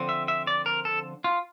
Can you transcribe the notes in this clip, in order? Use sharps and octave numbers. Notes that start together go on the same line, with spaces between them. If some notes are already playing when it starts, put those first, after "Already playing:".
Already playing: D3 F3 C4
E5
E5
D5
A#4
A4
F4